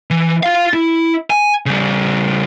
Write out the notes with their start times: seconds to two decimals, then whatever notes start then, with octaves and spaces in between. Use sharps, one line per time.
0.10 E3
0.43 F4 F5
0.73 E4
1.30 G#5
1.66 C#3 G3